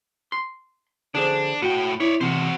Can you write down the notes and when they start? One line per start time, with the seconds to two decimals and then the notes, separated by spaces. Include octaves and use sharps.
0.32 C6
1.15 D3 D4 G#4 C5
1.62 A2 F#4 G5
2.00 E4 C#5 D5
2.21 E2 C3 F#4 C5